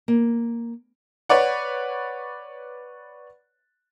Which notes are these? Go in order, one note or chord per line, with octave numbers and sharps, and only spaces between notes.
A#3
B4 C#5 D5 F#5